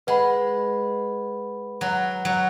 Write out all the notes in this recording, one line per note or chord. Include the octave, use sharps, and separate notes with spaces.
G#3 B4 F#5 B5
F#3
F#3